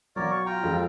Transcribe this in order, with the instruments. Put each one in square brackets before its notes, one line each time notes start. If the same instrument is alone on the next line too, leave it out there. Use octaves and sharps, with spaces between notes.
[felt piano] B1 F#3 [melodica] A#4 C#5 D5
[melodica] C#5 C#6
F4 G5 A#5
[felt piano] F2 G#3 A4